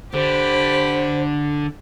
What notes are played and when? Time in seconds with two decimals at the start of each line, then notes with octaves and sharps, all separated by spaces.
0.14 D3 G4 C5 B5